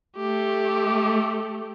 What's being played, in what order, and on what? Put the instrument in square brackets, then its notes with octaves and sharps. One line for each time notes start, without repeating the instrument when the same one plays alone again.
[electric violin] A3 G4